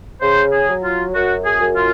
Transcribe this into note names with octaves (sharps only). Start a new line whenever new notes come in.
C#3 C5
G#4
F#3
F4
F#2 F#4
G#4
F#2
F4